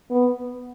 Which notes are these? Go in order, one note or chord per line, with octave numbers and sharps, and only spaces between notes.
B3